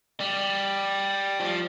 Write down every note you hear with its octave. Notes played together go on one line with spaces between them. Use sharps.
G3
F3